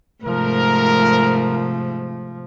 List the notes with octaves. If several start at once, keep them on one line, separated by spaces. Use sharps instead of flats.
G#2 C3 F3 A3 A#4